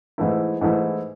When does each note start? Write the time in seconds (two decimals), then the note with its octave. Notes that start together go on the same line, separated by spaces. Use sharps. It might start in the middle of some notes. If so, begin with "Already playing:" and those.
0.18 G#2 E3 A3 E4
0.61 G#2 E3 A3 E4